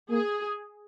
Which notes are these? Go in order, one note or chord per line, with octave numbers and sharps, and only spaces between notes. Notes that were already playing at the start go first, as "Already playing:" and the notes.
A#3 G#4